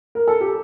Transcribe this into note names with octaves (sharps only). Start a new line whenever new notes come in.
A#4
A4
G4